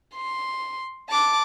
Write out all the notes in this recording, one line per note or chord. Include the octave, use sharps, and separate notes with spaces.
C6
A5 D6